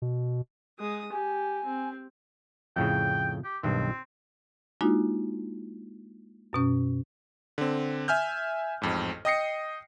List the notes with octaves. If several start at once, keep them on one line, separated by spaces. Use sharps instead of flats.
B2
G#3 D#6
G4 G#5
C4
F2 A2 C#3 G5
G4
B1 G2 D#3 C4
G#3 A#3 D4 D#4 F4 F#4
F#2 B2 C#4
D3 C4
E5 G#5 F6 G6
A1 F2 G#2
D#5 G5 D#6 A#6 C7 C#7